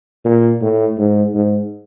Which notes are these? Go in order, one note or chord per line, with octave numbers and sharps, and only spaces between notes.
A#2
A2
G#2
G#2